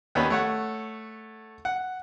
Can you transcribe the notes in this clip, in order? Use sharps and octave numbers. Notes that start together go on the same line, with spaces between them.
D#2 B3 C#4 B5
A3 C#5 F#5
F#5